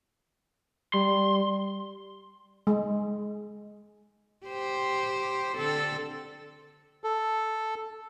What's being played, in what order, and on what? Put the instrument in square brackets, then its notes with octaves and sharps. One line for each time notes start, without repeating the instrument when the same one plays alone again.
[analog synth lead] G3 [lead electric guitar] C6
[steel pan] G#3
[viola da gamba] G4 C5
D3 C4 A4
[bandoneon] A4